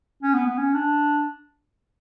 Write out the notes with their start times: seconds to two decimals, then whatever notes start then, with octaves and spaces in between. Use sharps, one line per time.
0.23 C#4
0.34 B3
0.46 B3
0.58 C#4
0.74 D4